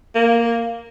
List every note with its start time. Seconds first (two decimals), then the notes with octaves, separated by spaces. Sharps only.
0.15 A#3